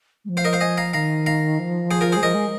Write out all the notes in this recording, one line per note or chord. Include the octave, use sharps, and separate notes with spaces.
G#3
F3
C5 F5
A#4 D#5
C5 F5
D#5 G#5
F5 A#5
D#3 F5 A#5
F5 A#5
F3
G#4 C5
F4 A#4
G#3 G#4 C5
F3 A#4 D#5
G#3